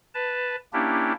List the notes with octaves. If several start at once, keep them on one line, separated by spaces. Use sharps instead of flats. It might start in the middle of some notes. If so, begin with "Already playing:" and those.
B4 A5
A#3 C#4 D4 E4 G4